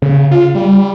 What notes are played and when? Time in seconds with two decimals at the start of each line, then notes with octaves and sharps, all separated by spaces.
0.02 C#3
0.31 F4
0.55 G3